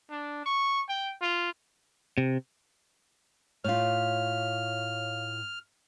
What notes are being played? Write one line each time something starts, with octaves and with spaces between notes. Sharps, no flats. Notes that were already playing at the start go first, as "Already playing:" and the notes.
D4
C#6
G5
F4
C3
A2 F4 C#5 F5 F6